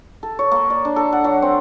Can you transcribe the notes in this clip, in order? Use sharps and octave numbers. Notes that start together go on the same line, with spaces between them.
A4
C#5
A#3
D5
D4
A4
F#5
F#3
C4